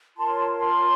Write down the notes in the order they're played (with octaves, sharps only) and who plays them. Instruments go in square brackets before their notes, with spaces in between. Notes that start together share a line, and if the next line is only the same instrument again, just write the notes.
[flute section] F4 A#4 C#5 A5 C6
A5 C6